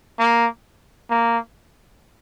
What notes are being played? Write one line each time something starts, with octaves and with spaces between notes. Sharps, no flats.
A#3
A#3